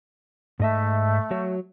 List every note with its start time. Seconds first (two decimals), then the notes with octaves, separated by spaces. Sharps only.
0.60 G#2 A3 D#5 E5
1.31 F#3 F#4 C#5